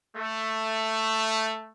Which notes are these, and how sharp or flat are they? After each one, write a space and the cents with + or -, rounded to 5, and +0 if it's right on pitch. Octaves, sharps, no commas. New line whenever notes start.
A3 +5